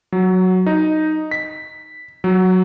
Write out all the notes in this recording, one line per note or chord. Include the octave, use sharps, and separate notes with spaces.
F#3
D#4
B6
F#3